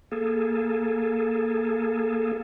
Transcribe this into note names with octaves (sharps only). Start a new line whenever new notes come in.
A#3 G#4 A4